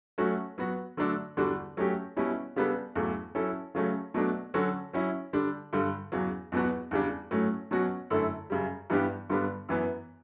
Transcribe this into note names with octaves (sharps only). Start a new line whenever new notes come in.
F#3 A3 C#4 F#4
F#3 B3 F#4
D3 F#3 A3 D4 A4
E2 D3 G3 D4 F#4
F#3 A3 C#4 G4
B2 G3 C#4 E4
C#3 G3 B3 D4 A4
E2 C#3 F#3 A3
F#3 C#4 E4 A4
C#3 F#3 A3 C#4
B2 F#3 A3 D4
D3 F#3 C#4 F#4 A4
F#3 C#4 E4
D3 G3 D4
G2 D3 G3
E2 C#3 F#3
E2 B2 F#3 B3 F#4
E2 C#3 G3 D4
A2 F#3 A3 C#4
B2 F#3 C#4 F#4
F#2 D3 A3 E4 A4
F#2 C#3 G3
G2 E3 B3 D4 G4
G2 D3 G3 B3 D4
F#2 E3 B3